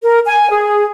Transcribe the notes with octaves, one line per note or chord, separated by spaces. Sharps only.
A#4
G#5
G#4